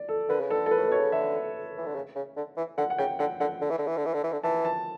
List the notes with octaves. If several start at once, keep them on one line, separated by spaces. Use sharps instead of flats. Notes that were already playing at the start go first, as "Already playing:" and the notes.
Already playing: D5
A4
D3 B4
C#3
D3 A4
A4
B4
A2
B2 C#5
C#3
D3 E5
E3
D3
C#3
C#3
D3
E3
D3 F#5
F#5
C#3 G5
D3 F#5
D3 F#5
D3
E3
D3
E3
D3
E3
D3
E3
D3
E3 A5
A5